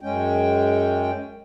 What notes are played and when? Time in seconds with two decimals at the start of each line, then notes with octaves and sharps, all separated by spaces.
0.01 F#2 G#3 C#4 G5